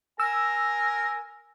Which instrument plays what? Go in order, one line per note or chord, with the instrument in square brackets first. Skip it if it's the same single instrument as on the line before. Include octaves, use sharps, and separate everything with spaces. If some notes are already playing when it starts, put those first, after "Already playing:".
[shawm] A#4 [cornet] G#5 [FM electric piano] E6